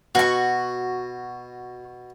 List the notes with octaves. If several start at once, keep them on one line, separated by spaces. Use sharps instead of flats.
B2 F#4 C#6